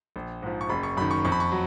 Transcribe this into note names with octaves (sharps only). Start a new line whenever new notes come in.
A#1
G#2 F3
C#6
F#1 B5
C#6
F#2 D#3 B5
C#6
F2 C#6
B5
C#6
F#3